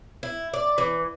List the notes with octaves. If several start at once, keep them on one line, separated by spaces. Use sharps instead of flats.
E4
D5
E3